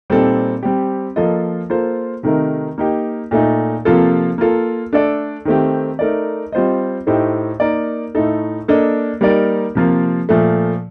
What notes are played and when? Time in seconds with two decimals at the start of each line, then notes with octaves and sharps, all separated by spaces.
0.10 A#2 G3 C4 D#4 A4
0.63 G3 C4 G4
1.16 F3 A#3 F4 A4 D#5
1.70 A#3 F4 A4 C5
2.23 C3 D#3 A3 D#4 A#4
2.78 A#3 D#4 G4
3.31 A#2 A3 D#4
3.85 C3 F3 A#3 F4 A4
4.38 A#3 F4 A4
4.93 A3 D4 A4 D5
5.45 D#3 A3 C4 G4
5.99 A3 D#4 A#4 D5
6.52 G3 C4 F4 C5 D#5
7.07 A2 A3 D#4 G4 C5
7.60 A#3 D#4 A#4 D5
8.15 A2 A3 D#4 A4
8.68 A#3 D4 A4 D#5
9.21 G3 A#3 D#4 A#4 D5
9.75 C3 F3 A#3 F4
10.29 A#2 F3 A3